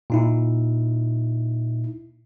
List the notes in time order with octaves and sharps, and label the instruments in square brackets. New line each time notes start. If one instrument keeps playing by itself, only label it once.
[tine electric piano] A#2 D#4 E4